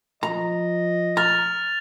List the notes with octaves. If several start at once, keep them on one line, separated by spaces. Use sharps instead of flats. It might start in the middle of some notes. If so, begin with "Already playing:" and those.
F3 D#5 A#5
A#5 F6 A6 F7